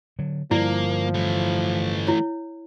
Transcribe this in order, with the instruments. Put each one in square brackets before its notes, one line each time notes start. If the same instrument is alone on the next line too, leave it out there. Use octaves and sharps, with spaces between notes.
[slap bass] D3 F#3
[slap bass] G2 D3 G3 [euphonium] F3 [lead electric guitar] A#3 [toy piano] E4 D5
[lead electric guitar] E3 A3
[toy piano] E4 C#5